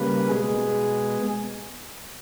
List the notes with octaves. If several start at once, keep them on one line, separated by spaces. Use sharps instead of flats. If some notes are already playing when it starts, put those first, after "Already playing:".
Already playing: C#3 G3 A#3 B4
B2 G#3 B3 G#4